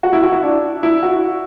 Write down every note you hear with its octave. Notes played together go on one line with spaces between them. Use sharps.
F#4
E4
F#4
E4
D4
E4
F#4